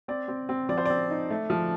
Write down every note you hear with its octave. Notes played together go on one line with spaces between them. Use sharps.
C4 D5
C4
C4
F3 D5
C5
C4 D5
D#4
A3
F3